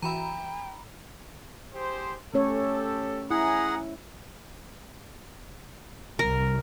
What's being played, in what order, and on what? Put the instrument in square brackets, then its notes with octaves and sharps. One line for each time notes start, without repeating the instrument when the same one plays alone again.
[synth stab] E3 F#4 E5 [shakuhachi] G5 [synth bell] A#5 B5
[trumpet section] G4 G#4 C5
[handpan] A3 C#4 C#5 [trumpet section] G4 A4
[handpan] E4 [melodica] G#4 F#5 [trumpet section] G#5 A#5
[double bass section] C2 [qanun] A#4